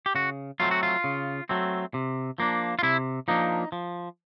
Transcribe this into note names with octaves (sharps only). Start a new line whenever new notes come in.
G4
C#3 F#4
F#3 A3 C4 F4
F#4
F4
C#3
F#3 A3 C4
C3
F3 A#3 D4
F4
C3 E4
F3 A#3 D4 D#4
F3